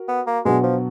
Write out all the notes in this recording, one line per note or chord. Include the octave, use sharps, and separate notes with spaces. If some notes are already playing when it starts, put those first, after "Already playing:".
Already playing: F#4 A#4
B3
A#3
B2 F#3 G#3 B3 D4 F#4
F3